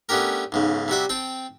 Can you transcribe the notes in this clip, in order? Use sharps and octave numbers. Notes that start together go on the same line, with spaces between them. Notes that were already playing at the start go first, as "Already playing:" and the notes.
A3 B3 C#4 D4 G4 A#4
B1 G#2 C#3
C3 G3 F#4 E5
C4 G5 A5